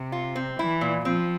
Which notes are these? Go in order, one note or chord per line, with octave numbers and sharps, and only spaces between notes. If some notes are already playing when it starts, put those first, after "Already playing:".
Already playing: C3
F4
C4
E3 E4
A#2
F3 C4